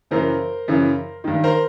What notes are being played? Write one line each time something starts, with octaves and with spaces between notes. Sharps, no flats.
F#2 C#3 E3 A#4 C5
F#2 C#3 E3
G2 D#3
A#4 C5